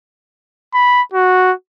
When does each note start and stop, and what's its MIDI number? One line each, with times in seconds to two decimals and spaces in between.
0.74 1.02 83
1.13 1.53 66